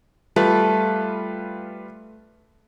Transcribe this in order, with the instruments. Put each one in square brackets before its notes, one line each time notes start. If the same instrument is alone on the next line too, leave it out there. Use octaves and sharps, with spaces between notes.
[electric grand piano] G3 F4 B4 [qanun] A3